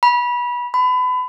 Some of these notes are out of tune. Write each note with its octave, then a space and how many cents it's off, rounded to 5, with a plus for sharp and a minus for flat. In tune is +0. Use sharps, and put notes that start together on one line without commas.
B5 -25
B5 +30